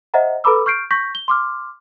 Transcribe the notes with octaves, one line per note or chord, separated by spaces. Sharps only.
C5 D#5 E5 F#5 A#5
A4 B4 A#5 B5 D6 E6
C#6 F6 G6 C7 D7
C#6 G6 A#6 B6
G7
C6 D6 F6